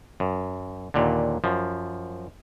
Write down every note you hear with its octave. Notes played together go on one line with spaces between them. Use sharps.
F#2
D#2 A#2 D3
F#2 F3